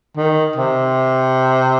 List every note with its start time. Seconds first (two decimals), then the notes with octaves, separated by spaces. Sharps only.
0.17 D#3
0.56 C3